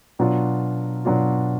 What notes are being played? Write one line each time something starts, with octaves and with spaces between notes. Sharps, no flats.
B2 F#3 D4 F4
B2 F#3 D4 F4